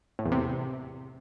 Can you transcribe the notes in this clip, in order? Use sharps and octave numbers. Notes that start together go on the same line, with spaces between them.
A2
E2
C3